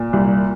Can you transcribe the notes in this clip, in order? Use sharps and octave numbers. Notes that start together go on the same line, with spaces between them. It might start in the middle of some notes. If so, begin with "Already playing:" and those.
Already playing: A#2
C2